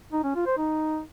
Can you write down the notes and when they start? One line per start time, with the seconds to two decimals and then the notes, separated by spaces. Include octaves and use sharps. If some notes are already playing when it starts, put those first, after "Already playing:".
0.13 D#4
0.24 C#4
0.35 F4
0.46 C5
0.58 D#4